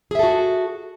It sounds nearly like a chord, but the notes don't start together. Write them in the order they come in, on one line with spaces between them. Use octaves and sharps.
G#4 E5 A4 F#4